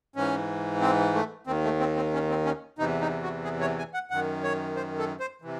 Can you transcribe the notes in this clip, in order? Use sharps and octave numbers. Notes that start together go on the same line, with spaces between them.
G#2 E3 C#4
C4
A3
D#2 D#3 C4
A3
C4
C4
C#4
C4
C#4
E2 C3 E3 D#4
D#4
F#4
G#4
C#5
G#5
F#5
F#2 D#3 F#5
C#5
C5
A4
C5
C3 E3